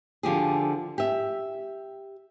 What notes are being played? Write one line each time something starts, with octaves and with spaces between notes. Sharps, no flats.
D3 F3 G4 G#4
G4 E5